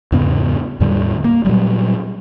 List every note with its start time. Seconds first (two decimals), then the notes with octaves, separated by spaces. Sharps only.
0.12 E2 G#2 C#3 B3
0.80 E2 A2 D3 G3
1.24 A#3
1.45 A#2 F#3 G3